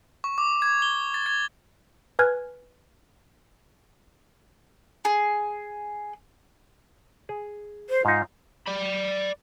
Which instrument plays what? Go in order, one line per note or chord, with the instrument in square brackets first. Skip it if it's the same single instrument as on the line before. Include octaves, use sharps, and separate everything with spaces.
[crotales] C#6
D6
G#6
G7
A6
G#6
[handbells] B4 G#5 F6 F#6 G#6
[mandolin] G#4
[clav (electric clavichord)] G#4
[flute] C5
[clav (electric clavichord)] G#2 D#4 [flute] F4
[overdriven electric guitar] D5 B5